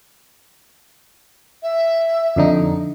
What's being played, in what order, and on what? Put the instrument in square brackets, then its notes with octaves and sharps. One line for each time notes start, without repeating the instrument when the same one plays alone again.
[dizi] E5
[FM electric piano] F2 D3 D#4